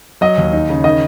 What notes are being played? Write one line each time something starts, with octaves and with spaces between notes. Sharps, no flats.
F#3 D#5
D#2
D#4
C#3
D#3 D#5